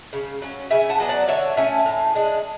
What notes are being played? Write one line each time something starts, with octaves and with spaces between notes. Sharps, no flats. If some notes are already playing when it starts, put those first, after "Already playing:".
C#3
F#3 C#4
C#3 E5 G#5
F#5 A5
F#3 B3 D4
D5 F#5
D3 C#5 E5
A3 C#4 E5 G#5
A2
G#3 D4